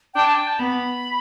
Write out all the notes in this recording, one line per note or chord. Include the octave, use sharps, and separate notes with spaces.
D4 G5
A5
G5
A5
B3 B5